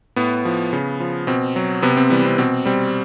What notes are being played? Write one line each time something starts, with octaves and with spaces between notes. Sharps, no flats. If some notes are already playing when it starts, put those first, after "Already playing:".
A2 B3
F3
C#3
F3
B2 C4
F#3
C3 B3
C4
E3 G3 B3
C4
B2 C4
G3 C4